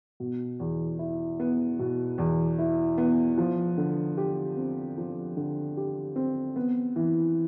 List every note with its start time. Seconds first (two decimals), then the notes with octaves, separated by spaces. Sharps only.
0.20 B2
0.60 E2
0.99 E4
1.40 B3
1.79 B2
2.18 E2
2.59 E4
2.98 B3
3.38 F3
3.77 D3
4.17 G4
4.57 C4
4.97 F3
5.37 D3
5.77 G4
6.16 C4
6.56 B3
6.96 E3